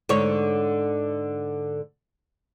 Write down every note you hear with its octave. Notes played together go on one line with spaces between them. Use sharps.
G#2 D3 C#5